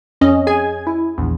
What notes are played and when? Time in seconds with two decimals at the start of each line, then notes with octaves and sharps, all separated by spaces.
0.21 F2 C#4 D#5
0.47 G#4 G#5 G#6
0.87 E4
1.18 A#1 E2